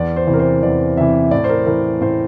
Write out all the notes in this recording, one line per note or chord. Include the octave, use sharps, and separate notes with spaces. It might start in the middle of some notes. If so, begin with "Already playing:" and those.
Already playing: E2 D5
C5
C3 E3
A#4
C5
E2 D5
C3 E3 E5
A2 D5
C5
A#4
E3 A#4
A2 C5